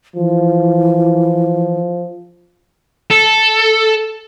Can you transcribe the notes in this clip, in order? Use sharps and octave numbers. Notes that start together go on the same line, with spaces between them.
E3 F3
A4